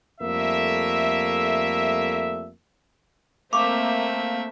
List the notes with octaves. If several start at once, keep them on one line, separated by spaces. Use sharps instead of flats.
F2 G3 A3 A#3 E5
A3 A#3 C4 E5 F5 C#6 D6